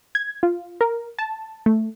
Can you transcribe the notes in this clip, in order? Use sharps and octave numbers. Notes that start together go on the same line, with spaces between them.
G#6
F4
A#4
A5
A3